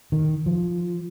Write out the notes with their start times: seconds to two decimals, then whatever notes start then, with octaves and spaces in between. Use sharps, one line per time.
0.12 D#3
0.46 F3